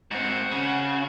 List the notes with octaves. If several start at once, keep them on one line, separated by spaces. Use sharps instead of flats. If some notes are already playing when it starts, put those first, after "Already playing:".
G#2 C4 F#4
C#3